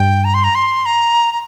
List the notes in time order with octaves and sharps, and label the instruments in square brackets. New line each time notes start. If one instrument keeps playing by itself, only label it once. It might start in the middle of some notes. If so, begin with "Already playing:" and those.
Already playing: [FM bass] G2 [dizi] G5
[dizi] A#5
C6
A#5
C6
A#5
A#5